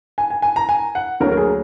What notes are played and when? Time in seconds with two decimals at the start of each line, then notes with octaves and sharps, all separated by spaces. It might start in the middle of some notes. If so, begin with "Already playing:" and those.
0.18 G#5
0.30 G#5
0.42 G#5
0.56 A#5
0.69 G#5
0.95 F#5
1.20 D2 D3 F#3 A#3 A#4
1.32 A#4
1.37 G#4